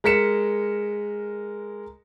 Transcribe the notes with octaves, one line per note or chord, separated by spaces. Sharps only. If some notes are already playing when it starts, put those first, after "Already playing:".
G#3 A#4 B6 C#7 E7